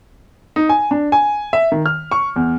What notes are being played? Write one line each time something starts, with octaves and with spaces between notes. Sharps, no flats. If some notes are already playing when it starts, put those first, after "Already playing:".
D#4
G#5
D4
G#5
E5
D#3
F6
C#6
E2